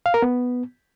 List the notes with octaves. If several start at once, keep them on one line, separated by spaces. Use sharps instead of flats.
F5
A#4
B3